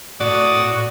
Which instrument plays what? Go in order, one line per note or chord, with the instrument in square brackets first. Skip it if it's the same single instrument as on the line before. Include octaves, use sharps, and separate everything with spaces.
[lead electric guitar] A2 [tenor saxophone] F#4 [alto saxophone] D5 [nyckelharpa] D#6